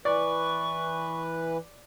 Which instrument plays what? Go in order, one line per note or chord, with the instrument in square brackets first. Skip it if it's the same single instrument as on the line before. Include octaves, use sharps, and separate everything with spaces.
[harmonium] E3 B4 [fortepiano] D5 [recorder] C#6